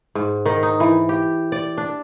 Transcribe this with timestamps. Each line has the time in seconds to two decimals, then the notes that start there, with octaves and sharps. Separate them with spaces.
0.15 G#2
0.46 D#3
0.63 D#4
0.80 E3
1.09 G4
1.52 D5
1.78 D4